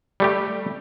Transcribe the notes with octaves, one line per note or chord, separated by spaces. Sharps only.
G3 A3 G4